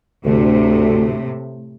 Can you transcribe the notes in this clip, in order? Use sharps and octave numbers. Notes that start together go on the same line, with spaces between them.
D2 A2 C3 A3